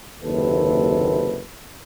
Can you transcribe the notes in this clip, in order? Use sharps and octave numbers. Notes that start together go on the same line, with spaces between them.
F#1 D#2 C3 A4 B4